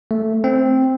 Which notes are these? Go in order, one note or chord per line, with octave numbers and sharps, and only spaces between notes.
A3
C4